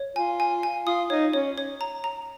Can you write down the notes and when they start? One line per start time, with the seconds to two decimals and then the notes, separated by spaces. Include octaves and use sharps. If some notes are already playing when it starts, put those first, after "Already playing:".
Already playing: C#5
0.16 F4 G#5
0.40 G#5
0.63 G#5
0.87 F4 D#6
1.10 D#4 C#5
1.33 C#4 C#5
1.58 C#5
1.81 A#5
2.04 A#5